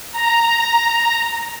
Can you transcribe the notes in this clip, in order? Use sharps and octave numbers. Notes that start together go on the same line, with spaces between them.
A#5